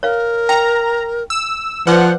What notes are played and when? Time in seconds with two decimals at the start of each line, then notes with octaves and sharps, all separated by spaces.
0.03 A#4 C#5 F5
0.49 G5 A#5
1.30 E6
1.87 F3 B4 C5 D5 F#5 D6